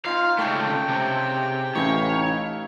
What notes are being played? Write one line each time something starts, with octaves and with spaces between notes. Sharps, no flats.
C4 D#4 F4 F5
C#2 C#3 A3 A4 C#5 G5
C3
A1 D#4 E4 C#5 F5